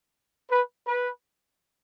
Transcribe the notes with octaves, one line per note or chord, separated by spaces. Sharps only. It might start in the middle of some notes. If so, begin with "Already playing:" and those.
B4
B4